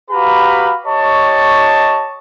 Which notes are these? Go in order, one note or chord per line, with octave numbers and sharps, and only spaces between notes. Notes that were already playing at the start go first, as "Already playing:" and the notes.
F#4 G4 B4 F5 A#5 B5
G4 C#5 D#5 A5 C#6